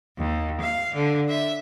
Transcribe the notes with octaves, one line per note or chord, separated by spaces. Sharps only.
D#2
F5
D3
E5